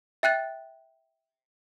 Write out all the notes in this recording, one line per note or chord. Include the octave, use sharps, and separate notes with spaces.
E5 G5 F#6 A6